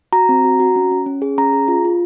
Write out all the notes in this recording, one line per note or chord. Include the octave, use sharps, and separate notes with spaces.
F#4 A#5
C4
F#4
F#4
C#4
C#4
C#4
G#4
C#4 A#5
G#4
F4
F4